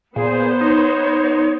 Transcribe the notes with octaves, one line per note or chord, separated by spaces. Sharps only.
A#2 B3 G#4 C5
D#4 C#5